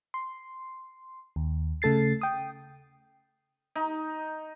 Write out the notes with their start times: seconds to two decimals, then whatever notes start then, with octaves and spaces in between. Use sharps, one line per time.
0.14 C6
1.36 D#2
1.82 C#3 A3 A4 A6 C7
2.21 G5 D#6
3.75 D#4